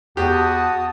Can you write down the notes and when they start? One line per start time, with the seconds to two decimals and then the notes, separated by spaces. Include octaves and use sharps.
0.17 E2 F#4 G4 A5 D#6